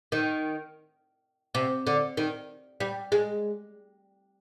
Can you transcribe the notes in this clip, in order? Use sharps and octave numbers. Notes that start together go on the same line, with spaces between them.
D#3
C3
D3
D#3
G3
G#3